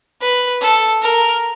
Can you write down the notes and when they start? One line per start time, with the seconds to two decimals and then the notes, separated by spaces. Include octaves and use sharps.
0.21 B4
0.61 A4
1.02 A#4